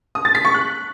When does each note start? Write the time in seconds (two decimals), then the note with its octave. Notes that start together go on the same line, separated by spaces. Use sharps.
0.15 D#6
0.25 A6
0.35 B6
0.45 C#6
0.54 F#6